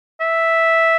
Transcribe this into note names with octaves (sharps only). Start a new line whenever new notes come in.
E5